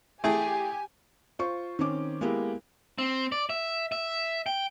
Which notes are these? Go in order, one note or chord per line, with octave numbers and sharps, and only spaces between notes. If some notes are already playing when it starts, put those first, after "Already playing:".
A3 E4 G4 G#4 G#5
F4 C5 C#6
D#3 C4 C#4 D6
G#3 A#3 B3 E4 G4
C4
D5
E5
E5
G5